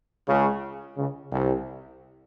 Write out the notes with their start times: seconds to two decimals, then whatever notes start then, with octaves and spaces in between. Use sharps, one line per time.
0.28 C#2 C#3
0.97 C#2 C#3
1.31 C2 C3